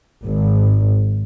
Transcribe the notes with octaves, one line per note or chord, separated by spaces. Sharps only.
G#1